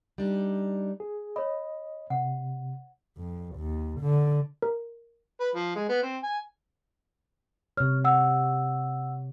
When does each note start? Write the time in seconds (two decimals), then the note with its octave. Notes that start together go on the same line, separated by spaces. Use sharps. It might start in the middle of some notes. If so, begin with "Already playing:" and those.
0.18 G3 D4 D#4
1.00 G#4
1.36 C#5 D#5 B5
2.10 C3 F#5
3.18 F2
3.56 D#2
4.01 D3
4.62 A#4
5.40 B4
5.55 F3
5.75 G#3
5.89 B3
6.03 C4
6.23 G#5
7.77 C3 C#5 F6
8.05 F#5 E6